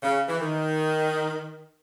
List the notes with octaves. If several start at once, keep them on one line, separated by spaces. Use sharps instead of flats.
C#3
E3
D#3